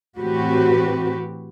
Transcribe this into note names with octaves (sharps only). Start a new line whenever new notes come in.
A2 E3 C4 F#4 G4 B4